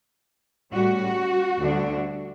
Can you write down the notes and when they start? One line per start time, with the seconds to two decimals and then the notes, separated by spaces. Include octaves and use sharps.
0.73 A2 G3 C#4 F#4
1.59 D2 D3 G3 D4